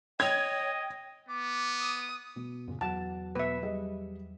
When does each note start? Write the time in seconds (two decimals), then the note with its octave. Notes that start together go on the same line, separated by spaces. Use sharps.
0.20 C#5 D#5 G5 G#6
1.28 B3 D6
1.80 D#6
2.36 B2
2.68 F#2 A#2 C#3
2.81 E2 F#3 F#4 F#5 A5 A6
3.35 B2 B4 E5
3.62 G3 G#4 D#5